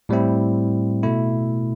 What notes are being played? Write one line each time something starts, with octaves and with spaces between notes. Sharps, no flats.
A2 G3 C4 E4
B2 A3 E4